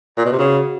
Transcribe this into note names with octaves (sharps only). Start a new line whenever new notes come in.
A#2
B2
C3
C#3 F#4